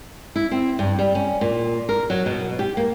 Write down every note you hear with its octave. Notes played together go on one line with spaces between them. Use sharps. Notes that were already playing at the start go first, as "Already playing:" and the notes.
E4
C4
G2
G3
C#4
A#2
A#4
F#3
B2
G4
A#3